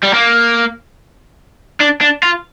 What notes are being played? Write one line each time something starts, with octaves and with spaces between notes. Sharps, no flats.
G3
A#3
D4
D4
F4